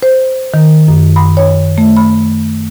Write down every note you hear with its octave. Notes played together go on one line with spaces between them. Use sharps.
C5
D#3
F#2
B5
C#5
A3
B5